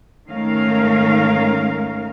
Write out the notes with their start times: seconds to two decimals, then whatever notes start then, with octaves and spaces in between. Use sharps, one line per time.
0.30 G#2 D#3 A3 C#4 A#4 F5